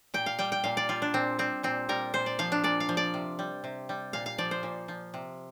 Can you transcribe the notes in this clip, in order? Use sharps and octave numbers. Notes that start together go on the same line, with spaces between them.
A#2 G5
F5
G3 G5
G5
A#2 F5
D5
G3 F4
D4
A#2 C4
G3 C4
A#2 C4
G3 A#4
A#2 C5
D5
F3 F5
D4
A#2 D5
F5
F3
D5
C3
G3
C3
G3
A#2 F5
F5
F3 D5
C5
A#2
F3
C3